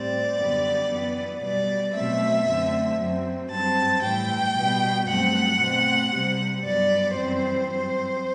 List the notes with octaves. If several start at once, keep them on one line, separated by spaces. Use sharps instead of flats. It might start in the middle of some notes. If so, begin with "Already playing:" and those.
Already playing: A2 G3 C4 D5
F#2 D3 G3 B3
F#2 E3 B3
B2 G3 B3 D5
B2 F#3 A3 C4 E5
F#2 D3 A3 C4
F#2 F#3 C4
G2 F#3 C4 A5
A2 E3 G3 G5
B2 G3 B3
G2 F#3 A3 C4 F#5
B2 A3 C4
C3 G3 C4
G2 F#3 B3 D5
F#2 E3 G3 C4 C5
G2 F#3 C4